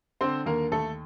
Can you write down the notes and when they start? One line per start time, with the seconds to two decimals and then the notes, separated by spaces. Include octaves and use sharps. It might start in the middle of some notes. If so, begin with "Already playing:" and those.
0.21 D3 C4 C5
0.46 D#2 A#3 A#4
0.72 D#2 A3 A4